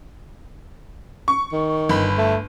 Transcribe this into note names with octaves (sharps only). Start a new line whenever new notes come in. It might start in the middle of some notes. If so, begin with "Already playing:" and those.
C#6
D#3
G1 B5
A3